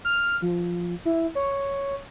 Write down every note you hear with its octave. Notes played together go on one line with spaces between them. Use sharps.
F6
F3
E4
C#5